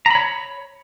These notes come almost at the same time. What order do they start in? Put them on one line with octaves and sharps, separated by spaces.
A#5 B5 C#5